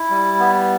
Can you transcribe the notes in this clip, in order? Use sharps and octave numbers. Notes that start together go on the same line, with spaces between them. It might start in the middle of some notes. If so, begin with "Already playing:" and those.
Already playing: E4
G3
B3